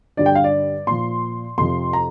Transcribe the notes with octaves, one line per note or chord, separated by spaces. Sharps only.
G2 D3 G3 D5
G5
F5
D5
A#2 F3 C6
F2 C3 F3 C6
A#5